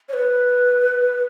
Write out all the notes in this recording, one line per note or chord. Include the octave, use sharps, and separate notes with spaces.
C#5
B4